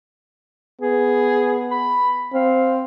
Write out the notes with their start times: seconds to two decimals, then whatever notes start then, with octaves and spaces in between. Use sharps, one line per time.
0.81 B3 G#4
1.71 B5
2.33 C4 F5